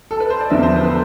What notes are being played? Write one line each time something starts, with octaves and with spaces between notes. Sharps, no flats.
A4
B4
C5
D5
E1 E2 D3 F3 E5
C5
B4
A4